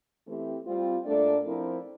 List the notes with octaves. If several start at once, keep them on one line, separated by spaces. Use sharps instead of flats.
E3 A3 C4 E4 G4
G3 C4 F4
A#2 A3 D4 A4 D5
F3 C4 E4 A#4